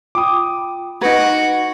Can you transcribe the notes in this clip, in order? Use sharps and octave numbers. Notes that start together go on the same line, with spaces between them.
F4 G5 B5 D6 D#6
D#4 F#4 B4 G#6 A#6 D7